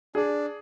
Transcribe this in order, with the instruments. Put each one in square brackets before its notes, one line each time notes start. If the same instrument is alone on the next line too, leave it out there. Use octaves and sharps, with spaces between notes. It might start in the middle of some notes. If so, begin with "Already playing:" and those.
[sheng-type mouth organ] D4 [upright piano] G#4